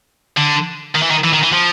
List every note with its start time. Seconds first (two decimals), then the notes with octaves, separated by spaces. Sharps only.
0.37 D3
0.95 D#3
1.03 E3
1.10 D#3
1.24 E3
1.33 D#3
1.43 E3
1.53 F3